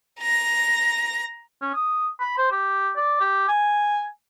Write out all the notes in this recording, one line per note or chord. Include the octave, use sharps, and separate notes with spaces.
A#5 A#6
C#4
D#6
B5
C5
G4
D5
G4
G#5